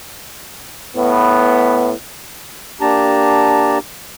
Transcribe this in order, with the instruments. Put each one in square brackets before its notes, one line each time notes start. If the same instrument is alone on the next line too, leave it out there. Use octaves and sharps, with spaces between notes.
[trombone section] A2 B3
[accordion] A#3 D4 G4 A5 A#5